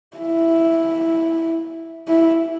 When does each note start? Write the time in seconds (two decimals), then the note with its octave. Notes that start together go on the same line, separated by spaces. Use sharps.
0.17 E4
2.08 E4